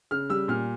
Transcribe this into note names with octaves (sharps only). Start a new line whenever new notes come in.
C#3 F6
G3 E6
A#2 F6